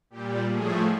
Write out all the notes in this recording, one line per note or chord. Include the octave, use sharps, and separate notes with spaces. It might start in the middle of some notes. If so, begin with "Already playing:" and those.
A#2 G3 G4
A2 F3 A3 G#4